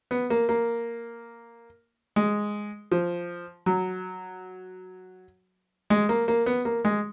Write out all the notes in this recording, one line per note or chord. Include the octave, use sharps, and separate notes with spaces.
B3
A#3
A#3
G#3
F3
F#3
G#3
A#3
A#3
B3
A#3
G#3